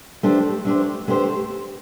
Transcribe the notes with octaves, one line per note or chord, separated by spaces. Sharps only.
A3 D4 G4 C5
A3 D4 G4 C5
A3 D4 G4 C5